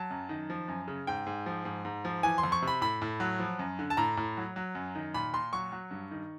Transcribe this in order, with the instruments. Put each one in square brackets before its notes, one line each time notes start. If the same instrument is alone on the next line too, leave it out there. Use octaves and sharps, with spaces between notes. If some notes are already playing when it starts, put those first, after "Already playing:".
Already playing: [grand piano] F#3 A5
F#2
D#3
F3
F#2
C#3
G#2 G5
G#2
F3
G#2
G#2
F3
E3 G#5
C6
F2
C#6
C3
B5
A2 B5
A2
F#3
F3
F#2
D3
A5
A2 A#5
A2
F#3
F#3
F#2
D#3
A#2 B5
A#2 C6
F#3 C#6
F#3
G2
D#3